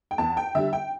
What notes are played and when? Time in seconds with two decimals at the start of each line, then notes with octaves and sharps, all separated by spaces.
0.11 G5
0.18 E2 A5
0.37 G5
0.55 D3 G3 E5
0.73 G5